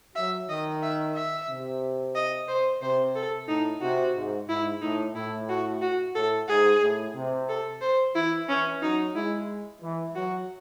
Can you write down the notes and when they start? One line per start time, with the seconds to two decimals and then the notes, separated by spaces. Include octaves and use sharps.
0.16 F#3 E5
0.49 D#3 D#5
0.83 E5
1.15 E5
1.49 C3
2.15 D#5
2.48 C5
2.82 C3 C5
3.16 A4
3.48 A2 D#4
3.82 C3 F#4
4.16 G#2
4.49 G#2 E4
4.82 A2 D#4
5.15 A2 E4
5.49 F#4
5.82 F#4
6.15 A2 A4
6.49 G#2 G#4
6.82 A2
7.15 C3
7.49 A4
7.82 C5
8.15 E3 E4
8.49 E3 C#4
8.82 F#3 D#4
9.15 G#3 E4
9.82 E3
10.15 F#3 F#4